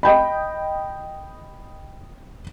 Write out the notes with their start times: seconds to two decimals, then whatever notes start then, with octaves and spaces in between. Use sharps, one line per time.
0.03 D#5 G5 B5